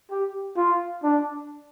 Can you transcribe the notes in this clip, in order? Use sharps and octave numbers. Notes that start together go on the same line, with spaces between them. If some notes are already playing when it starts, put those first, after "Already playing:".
G4
F4
D4